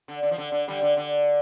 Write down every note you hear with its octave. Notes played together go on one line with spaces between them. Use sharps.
D3
D3
F3
D3
D3
D3 G3
D3
D3